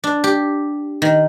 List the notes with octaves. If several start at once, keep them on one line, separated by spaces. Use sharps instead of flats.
D4
G4
D#3